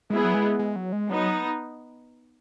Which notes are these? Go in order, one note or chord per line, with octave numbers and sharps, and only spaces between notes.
G#3 B3 E4 G#4
F#3
G#3
G#3
F#3
G#3
F#3 B3 D#4